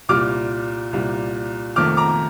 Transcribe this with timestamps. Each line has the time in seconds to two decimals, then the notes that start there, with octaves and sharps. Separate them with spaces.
0.09 C2 A#2 G3 D6 F6
0.93 C2 A#2 G3
1.76 F1 F2 D#3 A3 D6 F6
1.97 A#5 D6